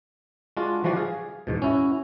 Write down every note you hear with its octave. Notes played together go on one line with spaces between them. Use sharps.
G#3 D4 F4 F#4
E3 F3 G3 F#4 D5
G#4 F5
E2 G#2 B2
C#4 E4 F#4